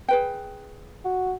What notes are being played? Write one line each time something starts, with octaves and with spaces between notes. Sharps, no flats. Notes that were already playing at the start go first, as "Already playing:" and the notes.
G#4 B4 G5
F#4